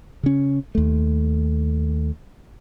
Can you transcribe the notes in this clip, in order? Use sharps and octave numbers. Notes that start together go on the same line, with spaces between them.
C#3 C#4
D#2 A3